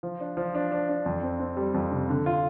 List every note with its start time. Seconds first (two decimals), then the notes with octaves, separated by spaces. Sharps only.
0.03 F3
0.21 D4
0.37 F3
0.55 D4
0.72 D4
0.89 D4
1.06 F2
1.23 C4
1.40 C4
1.57 G3
1.74 F2
1.92 C3
2.09 D3
2.26 F4